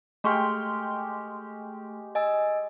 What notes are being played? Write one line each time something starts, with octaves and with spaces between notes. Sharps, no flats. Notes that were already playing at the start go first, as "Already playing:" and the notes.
G#3 A3 G4 G5 C#6 F6
D#5 G#5 E6